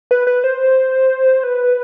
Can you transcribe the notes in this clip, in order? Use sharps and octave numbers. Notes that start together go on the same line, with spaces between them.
B4
B4
C5
B4